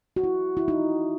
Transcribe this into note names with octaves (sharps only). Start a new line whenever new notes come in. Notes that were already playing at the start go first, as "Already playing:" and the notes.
F#4
E4
E4
D#4